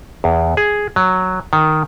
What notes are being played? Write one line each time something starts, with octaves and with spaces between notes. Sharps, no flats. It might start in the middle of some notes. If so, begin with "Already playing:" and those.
E2
G#4
F#3
D#3